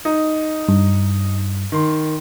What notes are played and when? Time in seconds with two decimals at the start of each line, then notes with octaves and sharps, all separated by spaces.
0.05 D#4
0.68 G2
1.72 D#3 C6